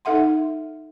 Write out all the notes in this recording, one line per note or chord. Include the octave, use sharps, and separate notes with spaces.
D#4 A4 E5 F#5 C6